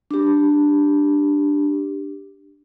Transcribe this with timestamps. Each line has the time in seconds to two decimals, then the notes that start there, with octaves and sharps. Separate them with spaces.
0.11 D4 G4